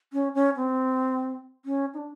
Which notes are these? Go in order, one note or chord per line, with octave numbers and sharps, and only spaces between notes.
C#4
C#4
C4
C#4
D#4
D4